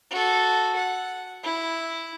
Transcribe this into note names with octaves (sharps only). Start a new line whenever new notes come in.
F#4 A4
F#5
E4